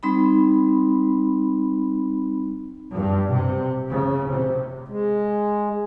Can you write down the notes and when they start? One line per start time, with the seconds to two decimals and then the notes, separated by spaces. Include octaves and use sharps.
0.03 G3 C4 D#4 B5
2.93 G2
3.28 C3
3.88 C#3
4.28 C3
4.88 G#3